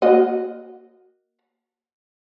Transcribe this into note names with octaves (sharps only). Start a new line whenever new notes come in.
A#3 F#4 D#5